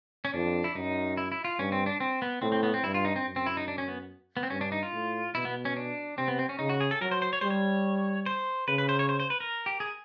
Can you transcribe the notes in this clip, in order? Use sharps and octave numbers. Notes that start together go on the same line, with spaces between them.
C#4
F2 D4
E4
F#2 D#4
E4
E4
F4
G2 C#4
C4
D4
C4
B3
A2 C4
C4
B3
C4
G2 E4
F4
D#4
C4
F#2
C4
E4
D#4
D4
C#4
B3
B3
C4
G2 C#4
D4
D#4
F4
A2
B2 E4
B3
C#4
D4
C3 C4
B3
C4
C#4
C#3 D#4
F#4
G#4
A4
F#3 A#4
C5
C5
C#5
G3 C5
C#5
C5
C#3 B4
B4
C5
C#5
C5
C5
B4
A#4
G4
G#4